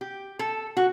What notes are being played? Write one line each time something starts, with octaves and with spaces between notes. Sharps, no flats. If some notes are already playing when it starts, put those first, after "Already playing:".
G4
A4
F#4